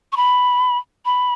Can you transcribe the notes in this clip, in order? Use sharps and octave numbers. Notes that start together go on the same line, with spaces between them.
C#6
B5
B5